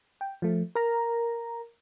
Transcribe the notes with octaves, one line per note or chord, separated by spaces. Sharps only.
G5
F3 A3
A#4 A#5